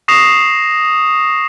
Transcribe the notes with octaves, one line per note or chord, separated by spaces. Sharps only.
C#6 D#6 A#6 C7 E7 F7